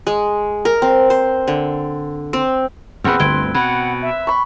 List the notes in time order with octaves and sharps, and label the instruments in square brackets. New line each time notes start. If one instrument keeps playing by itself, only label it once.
[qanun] G#3
A#4
C4
C5
D3
C4
[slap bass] E2 A#2 [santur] C4 B4 [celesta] G#4 F#5 F6
[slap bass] G1 D2 [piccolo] C6 [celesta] G#6 D7 G7
[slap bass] B2 [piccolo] F#5 [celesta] B5 F#6 G#6
[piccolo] E5
[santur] B5 C#6